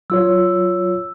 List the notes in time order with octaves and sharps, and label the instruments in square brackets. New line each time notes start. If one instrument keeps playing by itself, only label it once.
[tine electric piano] F#3 F4 C#5 [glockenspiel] E6